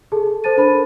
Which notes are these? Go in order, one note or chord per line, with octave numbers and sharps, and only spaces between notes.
G#4 A4 A5
A4 C5 A5 A6 D#7
D4 A#4 C5 A5 B5